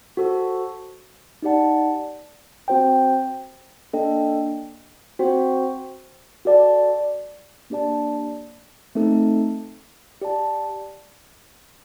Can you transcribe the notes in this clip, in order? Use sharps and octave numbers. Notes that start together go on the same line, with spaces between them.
F#4 A4 C5
D#4 G4 D5 F#5 A5
C4 F#4 C5 G5
A#3 D4 A4 D#5 G5
C4 F#4 C5 G5
F#4 A4 D5 A5
A#3 D4 G4 D5 A5
A3 C4 D#4 A4
G4 D5 A5